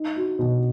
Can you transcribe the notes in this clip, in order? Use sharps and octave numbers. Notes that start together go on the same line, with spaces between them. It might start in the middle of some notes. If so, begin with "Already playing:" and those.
Already playing: D#4
F#4
B2